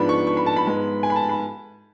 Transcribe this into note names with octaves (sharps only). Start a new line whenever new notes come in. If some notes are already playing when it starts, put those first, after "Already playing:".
Already playing: G#2 F3 B3 D4 B5
C#6
C#6
B5
A5
B5
G#2 G#3 B3
G#5
B5
A5
B5